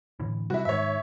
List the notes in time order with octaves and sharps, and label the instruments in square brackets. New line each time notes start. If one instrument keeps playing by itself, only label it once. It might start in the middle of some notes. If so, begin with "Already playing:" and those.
[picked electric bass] A2 D3 E3
[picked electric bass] C3 G3 [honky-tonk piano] E4 F#4
[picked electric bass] G#1 G#2 D#3 [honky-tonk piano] C#5 E5